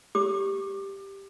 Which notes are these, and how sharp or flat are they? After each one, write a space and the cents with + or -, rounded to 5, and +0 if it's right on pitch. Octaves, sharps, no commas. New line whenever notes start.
G4 +0 D6 +25